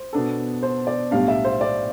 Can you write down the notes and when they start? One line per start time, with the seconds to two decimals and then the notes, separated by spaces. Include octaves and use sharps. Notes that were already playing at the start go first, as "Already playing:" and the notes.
Already playing: C5
0.13 B2 B3 D4 A4
0.63 C5
0.87 D5
1.11 B1 A2 G3 D4 F5
1.28 E5
1.45 C5
1.61 D5